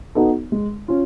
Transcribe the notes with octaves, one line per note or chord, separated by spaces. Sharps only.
B3 D#4 F#4 A4
G#3
C#4 F4